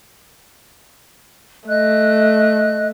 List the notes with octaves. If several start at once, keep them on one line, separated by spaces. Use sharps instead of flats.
A3 D#5 F#6